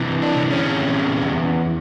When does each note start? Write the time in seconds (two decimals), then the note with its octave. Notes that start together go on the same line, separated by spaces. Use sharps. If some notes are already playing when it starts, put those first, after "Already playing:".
Already playing: C3 E3
0.22 D4
0.36 C3
0.51 C#4
0.79 E2
1.21 E2